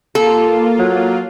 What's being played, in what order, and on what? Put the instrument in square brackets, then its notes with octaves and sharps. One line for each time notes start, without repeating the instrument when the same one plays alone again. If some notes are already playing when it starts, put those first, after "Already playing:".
[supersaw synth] A#3 F4 [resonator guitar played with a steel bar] A4
[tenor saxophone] F#3